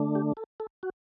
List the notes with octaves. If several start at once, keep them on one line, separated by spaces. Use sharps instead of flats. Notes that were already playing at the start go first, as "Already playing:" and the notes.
Already playing: D3 A3 D4
G4
A4
A4
F#4